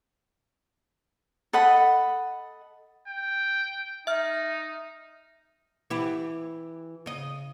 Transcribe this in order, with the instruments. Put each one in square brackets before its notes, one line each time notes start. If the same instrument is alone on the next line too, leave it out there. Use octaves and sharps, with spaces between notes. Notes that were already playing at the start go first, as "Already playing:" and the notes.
[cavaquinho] A4 D#5 F#5 B5
[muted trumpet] G5
[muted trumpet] D#4 [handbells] E5 F6
[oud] E3 E4 G4
C#3 D#5